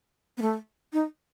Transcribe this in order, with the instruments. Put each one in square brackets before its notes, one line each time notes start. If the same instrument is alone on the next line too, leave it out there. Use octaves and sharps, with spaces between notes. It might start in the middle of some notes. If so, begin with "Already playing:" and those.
[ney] B3
A3
D#4